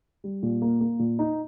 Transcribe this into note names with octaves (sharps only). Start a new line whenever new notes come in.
G3
A#2
A#3
A#3
A#2
D#4